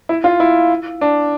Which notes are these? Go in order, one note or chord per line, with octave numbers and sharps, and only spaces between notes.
E4
F4
E4
D4